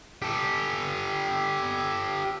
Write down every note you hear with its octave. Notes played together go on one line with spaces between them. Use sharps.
G4 A4